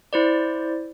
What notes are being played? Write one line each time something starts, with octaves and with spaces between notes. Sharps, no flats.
E4 C5 D5